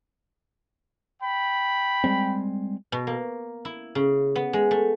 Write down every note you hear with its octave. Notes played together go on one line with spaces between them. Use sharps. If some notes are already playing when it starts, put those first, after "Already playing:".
G5 B5
G3 G#3 C4
B2
A#3
E4
C#3
B3
G#3
A3